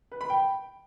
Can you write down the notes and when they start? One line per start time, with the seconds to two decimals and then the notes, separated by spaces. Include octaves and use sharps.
0.12 B4
0.21 B5
0.30 G5